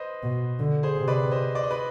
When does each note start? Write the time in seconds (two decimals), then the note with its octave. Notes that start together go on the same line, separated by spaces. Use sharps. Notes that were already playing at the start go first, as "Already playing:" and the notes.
Already playing: B4 C5 D#5
0.23 B2
0.59 D3
0.83 G#4 C5
0.96 C3
1.08 B4 D5
1.31 C5 D#5
1.55 D5
1.63 D#5
1.71 B4 D5